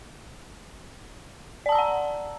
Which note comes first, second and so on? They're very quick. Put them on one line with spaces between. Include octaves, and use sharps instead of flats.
D5 A5 E6 A#5 F#5